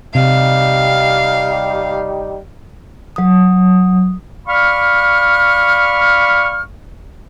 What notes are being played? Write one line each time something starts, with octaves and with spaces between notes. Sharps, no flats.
C3 G3 D#4 G4 F5
F#3 D#6
D5 F5 B5 C#6 F6